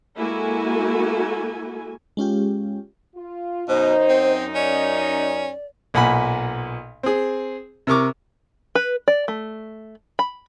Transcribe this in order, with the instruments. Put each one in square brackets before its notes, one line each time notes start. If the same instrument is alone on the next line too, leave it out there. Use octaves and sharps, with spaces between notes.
[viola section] G#3 A#3 E4 F#4 A4 G#5
[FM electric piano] G#3 C#4 F4 G4
[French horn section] F4
[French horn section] F#2 D#4 [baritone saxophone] B2 [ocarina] C5
[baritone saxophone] C4
[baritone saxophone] C#4 [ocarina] D5
[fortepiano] B1 A#2 F#5 G#5 B5
C4 G#4
C3 A#4 C#6 D6
[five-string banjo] B4
D5
A3
B5